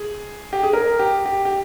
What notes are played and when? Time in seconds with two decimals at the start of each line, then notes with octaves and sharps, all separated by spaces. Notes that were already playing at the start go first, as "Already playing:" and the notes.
Already playing: G#4
0.53 G4
0.63 G#4
0.73 A#4
0.99 G4
1.26 G4
1.45 G4